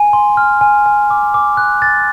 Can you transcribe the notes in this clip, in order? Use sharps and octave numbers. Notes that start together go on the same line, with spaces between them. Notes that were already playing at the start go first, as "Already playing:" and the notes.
Already playing: G#5
C6
F6
G#5
G#5
D6
D6
F#6
A6